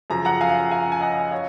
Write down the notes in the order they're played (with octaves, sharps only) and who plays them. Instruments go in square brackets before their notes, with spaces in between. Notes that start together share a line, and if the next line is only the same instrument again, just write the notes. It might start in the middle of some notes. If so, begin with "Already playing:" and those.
[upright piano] F#2 C#3 F3 A#5
F#5 A#5
F5 G#5
F5 G#5
G#5
D#5 F#5
C#5 F5